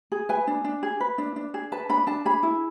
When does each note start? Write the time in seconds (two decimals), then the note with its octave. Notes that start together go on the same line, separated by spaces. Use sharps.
0.12 G#4
0.29 B4 G#5
0.47 D4
0.64 D4
0.83 G#4
1.00 B4
1.18 D4
1.36 D4
1.54 G#4
1.72 B4 A5
1.89 D4 B5
2.07 D4 A5
2.25 G#4 B5
2.43 E4